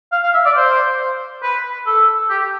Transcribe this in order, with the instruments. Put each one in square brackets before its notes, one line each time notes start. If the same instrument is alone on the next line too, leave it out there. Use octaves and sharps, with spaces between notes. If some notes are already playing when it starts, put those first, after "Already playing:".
[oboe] F5
F5
E5
D5
C5
B4
A4
G4